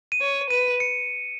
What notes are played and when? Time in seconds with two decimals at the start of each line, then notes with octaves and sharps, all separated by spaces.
0.12 D#7
0.21 C#5
0.50 B4 D#7
0.80 C#7